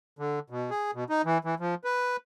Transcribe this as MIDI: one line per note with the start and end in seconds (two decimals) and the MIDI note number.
0.19 0.39 50
0.50 0.70 47
0.70 0.91 68
0.95 1.04 47
1.09 1.22 63
1.25 1.38 52
1.44 1.55 52
1.60 1.75 53
1.84 2.17 71